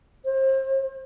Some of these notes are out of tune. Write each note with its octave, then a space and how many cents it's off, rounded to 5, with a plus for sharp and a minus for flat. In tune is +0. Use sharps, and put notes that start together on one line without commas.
C5 +35